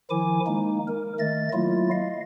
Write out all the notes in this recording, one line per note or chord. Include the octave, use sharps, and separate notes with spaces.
D#3 F3 E4 G#5 D6
G#3 A#3 D#4
A#4
D#3 A3 D#5 A6
F#3 A3 A#3 E4 F4
D#5 F5